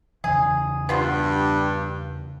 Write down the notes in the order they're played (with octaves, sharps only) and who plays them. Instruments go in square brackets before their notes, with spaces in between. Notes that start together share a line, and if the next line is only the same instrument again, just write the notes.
[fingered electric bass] E2 C#3 E3 [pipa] G#4
[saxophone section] G2 [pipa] B3 F4 F#4